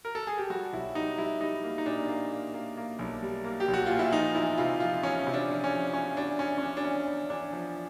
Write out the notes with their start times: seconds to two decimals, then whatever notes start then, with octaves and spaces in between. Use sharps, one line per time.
0.05 A#4
0.15 A4
0.27 G#4
0.38 G4
0.50 G3 F#4
0.73 B1 E4
0.95 G3 D#4
1.18 G3 E4
1.41 G3 D#4
1.64 A#3
1.78 D#4
1.86 A#2 D4
2.09 A#3
2.32 A#3
2.54 A#3
2.77 A#3
2.99 B1
3.22 G3
3.44 A#3
3.60 G4
3.68 B1
3.74 F#4
3.86 A#2 F4
3.99 E4
4.13 F3 D#4
4.35 E2 E4
4.58 C3 F4
4.80 F3 F4
5.03 E2 C#4
5.27 C3
5.34 D4
5.49 F3
5.64 C#4
5.71 F3
5.94 E2 C#4
6.17 E2 D4
6.39 E2 C#4
6.58 C#4
6.62 E2 D4
6.77 D4
6.85 E2 C#4
7.07 E2
7.30 E2 D4
7.52 F3